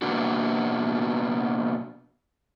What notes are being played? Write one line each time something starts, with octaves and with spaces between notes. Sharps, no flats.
B2 A#3 B3 D4 F#4